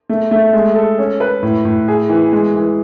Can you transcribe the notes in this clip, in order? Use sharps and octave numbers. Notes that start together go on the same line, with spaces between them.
A3
A3
G#3
A4
C#4
B4
A2
A2
G#4
E3
G#3
E3